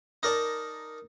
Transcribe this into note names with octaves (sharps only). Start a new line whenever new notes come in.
D#4 A#4 D5 A5